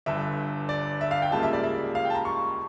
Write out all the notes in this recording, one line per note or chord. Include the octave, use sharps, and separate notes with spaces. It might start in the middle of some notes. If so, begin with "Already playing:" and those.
G1 G2 D3 E5
D5
E5
F5
G5
C#2 C#3 G3 A#3 A5
E5
D5
E5
F5
G5 A5
A#5
C#6